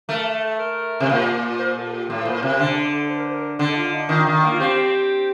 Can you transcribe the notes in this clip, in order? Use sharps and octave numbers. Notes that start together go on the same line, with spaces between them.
A3 A#4
A4
A#4
C3
A#2
C5
A4
G4
A2 A4
A#2 C5
F4
C3 A#4
D3 A4
A4
C5
A#4
C5
A#4
D3 A4
D#4
F4
D#4
D#3 F4
D#3
A#3
F4
C4 G4